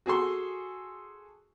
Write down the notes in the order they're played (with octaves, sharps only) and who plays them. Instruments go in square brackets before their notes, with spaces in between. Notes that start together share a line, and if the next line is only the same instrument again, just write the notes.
[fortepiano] F#4 G#4 A4 C6